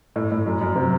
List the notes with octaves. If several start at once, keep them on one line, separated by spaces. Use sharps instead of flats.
A2
A2
F#2
F#2
C3